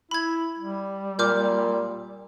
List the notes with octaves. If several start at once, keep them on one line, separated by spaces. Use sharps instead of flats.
E4 B5 G#6
G3
A#2 D6 F6 G6